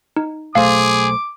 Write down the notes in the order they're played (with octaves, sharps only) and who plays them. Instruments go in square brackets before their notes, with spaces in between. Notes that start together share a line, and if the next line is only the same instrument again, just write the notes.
[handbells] D#4
[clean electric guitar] B1 A3 C5 [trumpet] G#4 [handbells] F5 [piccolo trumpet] D6